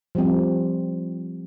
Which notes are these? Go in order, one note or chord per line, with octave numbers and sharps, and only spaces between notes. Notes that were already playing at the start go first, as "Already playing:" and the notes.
F3 G3 C4